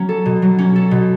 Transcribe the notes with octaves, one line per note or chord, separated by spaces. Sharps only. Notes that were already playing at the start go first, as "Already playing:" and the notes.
Already playing: F#3 C#4
A4
B2
F#3
C#4
A4
B2